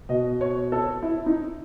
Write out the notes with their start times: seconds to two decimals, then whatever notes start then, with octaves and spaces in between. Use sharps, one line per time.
0.09 B2 D#5
0.41 C#5
0.72 A4
1.03 E4
1.26 D#4